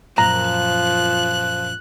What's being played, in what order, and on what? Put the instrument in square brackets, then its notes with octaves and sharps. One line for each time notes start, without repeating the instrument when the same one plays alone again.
[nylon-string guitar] F#2 A#2 [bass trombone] F3 [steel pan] A#5 [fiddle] F#6